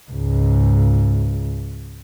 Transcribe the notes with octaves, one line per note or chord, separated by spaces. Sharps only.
C#2 G#2